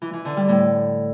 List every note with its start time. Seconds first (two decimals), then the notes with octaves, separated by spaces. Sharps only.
0.02 E3
0.13 E3
0.25 D3
0.37 G3
0.48 A2